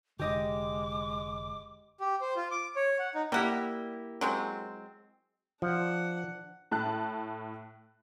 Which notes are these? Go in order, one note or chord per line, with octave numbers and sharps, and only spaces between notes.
F1 D3 G#3 G4 D#5 D6
G4
C5
F4
D6
C#5
F#5
D#4
G3 A#3 E4 G4 F#5
F#3 G#3 C4
F3 D4 F#5
A2 A5 F#6